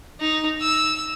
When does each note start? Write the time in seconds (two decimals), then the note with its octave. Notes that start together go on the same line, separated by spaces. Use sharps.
0.20 D#4
0.61 E6